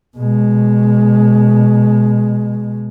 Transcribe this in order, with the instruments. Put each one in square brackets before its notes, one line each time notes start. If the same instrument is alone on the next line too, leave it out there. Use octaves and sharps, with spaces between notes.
[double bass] B2 G#3